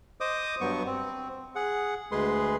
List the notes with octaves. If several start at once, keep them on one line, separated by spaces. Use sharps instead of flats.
C5 D#5 D6 D#6
G2 F#3 B3 C#6
C4
G#4 F#5
D2 G#3 G#4 B4 C6